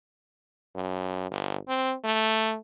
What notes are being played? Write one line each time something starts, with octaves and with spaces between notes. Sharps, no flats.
F#2
G1
C4
A3